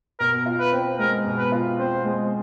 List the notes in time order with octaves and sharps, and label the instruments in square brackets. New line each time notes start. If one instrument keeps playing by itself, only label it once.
[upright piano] B2 [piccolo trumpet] A#4
[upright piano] F4
[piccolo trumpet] B4
[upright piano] C4
[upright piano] G#3 [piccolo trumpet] A#4
[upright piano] B2
[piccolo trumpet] B4
[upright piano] F4
[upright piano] C4 [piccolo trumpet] C5
[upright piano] G#3